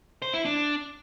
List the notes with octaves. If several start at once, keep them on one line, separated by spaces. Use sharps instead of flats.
C5
E4
D4